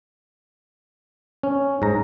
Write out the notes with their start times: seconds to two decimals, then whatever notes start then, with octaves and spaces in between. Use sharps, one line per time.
1.43 C#4
1.82 G#2 A#5